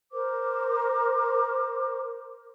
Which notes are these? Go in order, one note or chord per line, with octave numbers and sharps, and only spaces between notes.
A#4 C5 D6